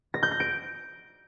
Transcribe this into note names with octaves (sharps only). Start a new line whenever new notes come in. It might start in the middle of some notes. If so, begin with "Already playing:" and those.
A#6
G6
A#6
D7